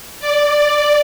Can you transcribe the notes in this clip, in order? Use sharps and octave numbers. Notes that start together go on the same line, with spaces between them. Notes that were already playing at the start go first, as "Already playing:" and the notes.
D5